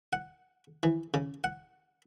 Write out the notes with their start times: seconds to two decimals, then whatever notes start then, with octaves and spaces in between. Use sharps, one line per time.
0.13 F#5
0.83 E3
1.14 C#3
1.44 F#5